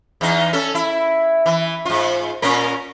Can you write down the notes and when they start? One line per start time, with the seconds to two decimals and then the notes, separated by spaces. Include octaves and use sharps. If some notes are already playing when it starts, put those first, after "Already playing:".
0.21 E2 D#4
0.53 C#4 A4
0.75 E4
1.46 E3
1.85 G#2 F4
2.42 A#2 C#4 A#4